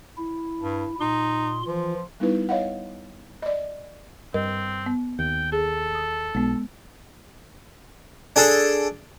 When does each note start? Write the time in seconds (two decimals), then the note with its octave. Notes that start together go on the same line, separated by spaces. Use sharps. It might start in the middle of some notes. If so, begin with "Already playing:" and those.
0.18 E4
0.61 G2
1.00 A#2 D#4 C6
1.67 E3 F3 F4
2.20 G3 B3 D#4 E4 B4
2.49 C#5 D#5 F5 F#5
3.42 D5 D#5
4.34 G2 C4 A#4 D#5
4.86 B3
5.19 D#2 G5
5.52 G#4 A4
5.95 D#6
6.35 B1 G#3 B3
8.36 D4 G#4 A4